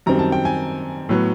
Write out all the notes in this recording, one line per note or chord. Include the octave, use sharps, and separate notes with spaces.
F#2 D#3 G3 C4 A#5
A5
G5
G#5
A2 F#3 B3